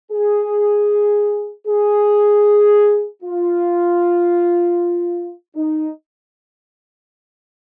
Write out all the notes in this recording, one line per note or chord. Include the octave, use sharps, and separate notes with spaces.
G#4
G#4
F4
D#4